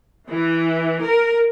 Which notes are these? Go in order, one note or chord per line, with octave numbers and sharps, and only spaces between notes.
E3
A#4